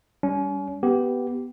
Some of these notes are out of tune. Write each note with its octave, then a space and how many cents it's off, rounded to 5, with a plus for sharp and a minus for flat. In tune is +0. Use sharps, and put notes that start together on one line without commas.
G3 +0 C#4 +35
B3 +0 G4 -10